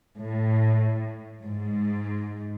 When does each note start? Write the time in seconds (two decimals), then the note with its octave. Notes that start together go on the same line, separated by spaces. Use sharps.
0.17 A2
1.45 G#2